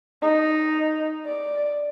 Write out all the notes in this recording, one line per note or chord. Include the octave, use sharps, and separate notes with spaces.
D#4
D5